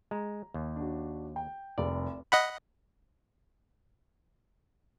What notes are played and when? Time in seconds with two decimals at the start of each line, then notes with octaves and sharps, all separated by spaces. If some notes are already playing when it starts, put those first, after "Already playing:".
0.11 G#3 A#5
0.54 D#2
0.76 D4 F#4
1.36 G5
1.78 F1 C2 D5
2.32 D#5 F#5 B5